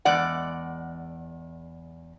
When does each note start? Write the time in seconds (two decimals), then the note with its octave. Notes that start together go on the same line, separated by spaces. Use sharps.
0.05 E2 G#3 D5 F#5